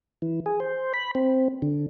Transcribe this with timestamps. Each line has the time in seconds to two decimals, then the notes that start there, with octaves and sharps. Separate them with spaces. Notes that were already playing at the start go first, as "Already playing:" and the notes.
0.22 E3
0.46 G#4
0.60 C5
0.94 B5
1.15 C4
1.62 D3